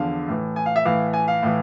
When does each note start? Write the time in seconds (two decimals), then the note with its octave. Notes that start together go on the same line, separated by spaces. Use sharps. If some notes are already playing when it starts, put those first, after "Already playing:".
Already playing: E2 D3 F3 F5
0.28 A2 E3
0.56 G#5
0.66 F5
0.76 E5
0.85 A2 E3 F5
1.13 G#5
1.28 F5
1.43 A2 E3